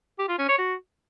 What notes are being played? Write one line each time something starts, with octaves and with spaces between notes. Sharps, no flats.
G4
F4
C#4
C#5
F#4